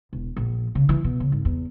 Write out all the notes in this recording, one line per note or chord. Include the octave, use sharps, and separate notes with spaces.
E1
A#1
C#3
E3
B2
C#3
G#1
E2